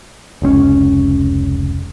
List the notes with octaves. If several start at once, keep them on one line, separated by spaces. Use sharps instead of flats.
F1 C#2 C4 C#4